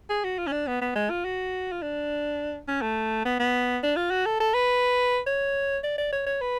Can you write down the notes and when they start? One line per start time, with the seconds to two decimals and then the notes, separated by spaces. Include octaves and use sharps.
0.10 G#4
0.24 F#4
0.39 F4
0.47 C#4
0.52 D4
0.67 B3
0.81 B3
0.95 G#3
1.10 F4
1.25 F#4
1.72 F4
1.82 D4
2.68 C#4
2.82 A3
3.25 B3
3.40 B3
3.83 D4
3.96 F4
4.11 F#4
4.26 A4
4.40 A4
4.54 B4
5.27 C#5
5.84 D5
5.98 D5
6.13 C#5
6.26 C#5
6.41 B4